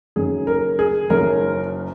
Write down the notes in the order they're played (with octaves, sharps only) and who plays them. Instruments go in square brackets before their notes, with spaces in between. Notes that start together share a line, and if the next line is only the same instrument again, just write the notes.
[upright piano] F#1 F#2 D#3 G#4
A#4
G#4
F#1 F#2 D#3 A#4